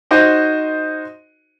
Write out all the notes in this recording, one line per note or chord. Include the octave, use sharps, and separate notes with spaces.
D#4 F#4 C5 D#5